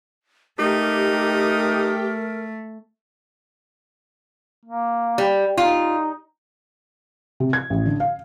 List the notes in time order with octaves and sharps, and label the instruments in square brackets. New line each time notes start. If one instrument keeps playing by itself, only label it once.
[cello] A3 [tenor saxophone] D#4 [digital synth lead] G4 [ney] A#4
[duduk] A#3
[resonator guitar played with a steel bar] G3
[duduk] D#4 [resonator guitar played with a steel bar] F4
[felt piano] C3
G#6
A1
D3
F5